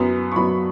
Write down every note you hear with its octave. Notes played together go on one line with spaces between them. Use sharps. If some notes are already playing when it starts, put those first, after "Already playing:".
Already playing: F#2 F#3 B3
C#6
F#2 F#3 B3 B5